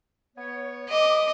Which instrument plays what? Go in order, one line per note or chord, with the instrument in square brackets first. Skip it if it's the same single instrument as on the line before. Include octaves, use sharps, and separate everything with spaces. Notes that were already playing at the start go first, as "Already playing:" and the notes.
[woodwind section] B3 C#5
[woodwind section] G#3 B4 D6 [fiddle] D#5